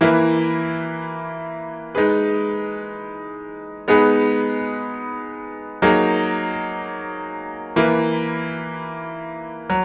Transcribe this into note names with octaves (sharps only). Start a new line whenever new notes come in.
E3 A#3 E4 B4
G#3 D#4 G#4 B4
G#3 B3 D#4 G#4 B4
F#3 A#3 D#4 G#4
E3 A#3 E4 B4
F#3